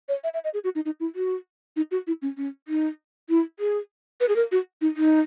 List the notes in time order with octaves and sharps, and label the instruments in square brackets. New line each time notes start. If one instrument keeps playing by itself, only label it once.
[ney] C#5
E5
E5
D#5
G#4
F#4
D#4
D#4
E4
F#4
D#4
F#4
E4
C#4
C#4
D#4
E4
G#4
B4
G#4
A#4
F#4
D#4
D#4